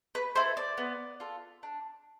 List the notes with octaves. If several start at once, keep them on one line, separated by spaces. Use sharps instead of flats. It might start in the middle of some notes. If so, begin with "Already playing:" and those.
B4
E4 A4 C5
D5
B3
F4 A4
D4